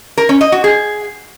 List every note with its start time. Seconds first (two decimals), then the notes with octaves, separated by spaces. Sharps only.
0.18 A#4
0.29 C#4
0.41 D#5
0.52 F#4
0.64 G#4